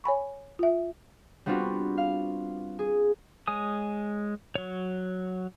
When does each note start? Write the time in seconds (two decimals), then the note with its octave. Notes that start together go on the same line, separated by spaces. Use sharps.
0.04 C#5 G#5 B5 C#6
0.59 F4 E5
1.46 G3 B3 C4 D4 F4 F#4
1.98 F5
2.79 G#4
3.47 G#3 C#5 G#5 D#6
4.55 F#3 C#5